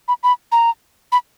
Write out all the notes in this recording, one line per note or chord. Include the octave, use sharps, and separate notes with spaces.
B5
B5
A#5
B5